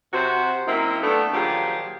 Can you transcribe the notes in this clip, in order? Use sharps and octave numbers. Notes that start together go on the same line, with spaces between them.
C3 F#4 C5
F#2 A#3 C4 D#4 E4
A3 B3 D4
A#2 D#3 F3 F#3 G4 G#4